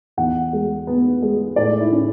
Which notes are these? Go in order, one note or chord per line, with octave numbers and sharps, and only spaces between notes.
E2 F#5
G#3
B3
G#3
A2 D5
E4
C#4